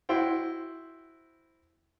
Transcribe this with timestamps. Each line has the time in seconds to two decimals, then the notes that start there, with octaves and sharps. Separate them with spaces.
0.09 E4 F#4 C5 G5